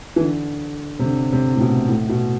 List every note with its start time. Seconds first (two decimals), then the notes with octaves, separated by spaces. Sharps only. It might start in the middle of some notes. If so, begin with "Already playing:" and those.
0.16 E3
0.21 D3
0.99 C3
1.04 D3
1.32 C3
1.54 A2
1.61 B2
1.88 A2
2.09 B2